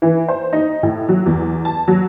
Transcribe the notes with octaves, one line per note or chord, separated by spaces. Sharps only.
E3
C5
D#4
A2
F#3
E2
A5
F#3